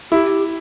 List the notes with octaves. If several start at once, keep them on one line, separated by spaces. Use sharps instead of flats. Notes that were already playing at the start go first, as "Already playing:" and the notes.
E4 G4